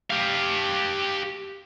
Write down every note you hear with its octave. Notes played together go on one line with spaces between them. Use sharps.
G4 F5